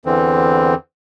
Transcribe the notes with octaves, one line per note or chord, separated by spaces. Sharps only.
E2 D3 E3 C4